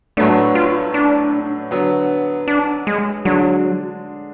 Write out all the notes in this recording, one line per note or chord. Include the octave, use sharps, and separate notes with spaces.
A2 F#3 A3 B3 D4
F4
D4
D3 F#3 B3
D4
G#3
D3 F#3 G#3 D4